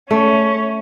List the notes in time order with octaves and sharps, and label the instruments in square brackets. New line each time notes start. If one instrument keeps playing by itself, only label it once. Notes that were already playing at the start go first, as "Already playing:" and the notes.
[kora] A3 [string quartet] C#4